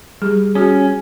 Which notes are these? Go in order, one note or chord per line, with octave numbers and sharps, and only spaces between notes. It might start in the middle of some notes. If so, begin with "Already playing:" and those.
G3 G#4
C#4 F#4 G#4